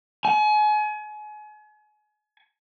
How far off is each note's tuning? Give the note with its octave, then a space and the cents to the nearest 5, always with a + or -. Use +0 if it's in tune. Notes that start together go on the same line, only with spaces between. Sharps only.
G#5 +35